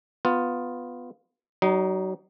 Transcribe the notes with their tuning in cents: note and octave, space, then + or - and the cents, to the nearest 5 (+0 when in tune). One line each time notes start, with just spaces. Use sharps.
B3 +10 F4 +10
F#3 +35 D#4 -10